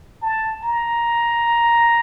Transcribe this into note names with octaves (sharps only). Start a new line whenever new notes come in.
A5
A#5